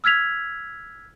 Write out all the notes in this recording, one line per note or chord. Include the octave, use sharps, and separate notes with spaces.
E6 F6 G#6 B6 F7